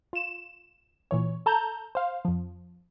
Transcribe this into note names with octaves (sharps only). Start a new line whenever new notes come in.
F4 E7
A#2 E3 C#5
A4 A5 A#5 G6
C5 F5
F2 F3